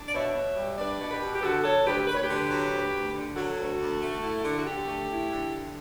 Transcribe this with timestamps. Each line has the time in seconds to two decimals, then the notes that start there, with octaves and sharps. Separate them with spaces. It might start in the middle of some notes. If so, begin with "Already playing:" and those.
Already playing: D4
0.08 D5
0.13 B2 C#5 E5
0.34 B2
0.56 G3
0.77 D4 B4 D5
0.99 B2
1.11 G4 B4
1.21 B2
1.34 G4
1.43 D3 F#4 A4
1.64 F#3 A4 C#5
1.85 D2 G4 B4
2.07 D2 B4
2.15 C#5
2.22 G4 B4
2.29 D3
2.50 F#3
2.72 D2
2.93 D2
3.15 D3
3.36 F#3 F#4 A4
3.58 D2
3.79 D2
4.01 A3
4.22 E4
4.44 D3
4.58 F#4
4.66 D3 G4
4.87 A3
5.09 E4
5.31 D3
5.52 D3